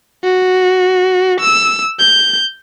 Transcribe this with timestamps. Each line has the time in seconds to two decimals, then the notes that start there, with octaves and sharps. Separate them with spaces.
0.24 F#4
1.41 E6
2.00 G6